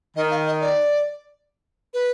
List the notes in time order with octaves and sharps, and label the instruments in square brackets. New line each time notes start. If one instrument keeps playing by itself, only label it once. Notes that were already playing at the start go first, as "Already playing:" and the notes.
[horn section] D#3 [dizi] D#5
[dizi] F5
D#5
D5
B4